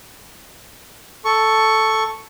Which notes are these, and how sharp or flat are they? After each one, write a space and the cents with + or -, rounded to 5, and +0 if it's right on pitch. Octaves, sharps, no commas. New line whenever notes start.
A4 +0 C#6 +0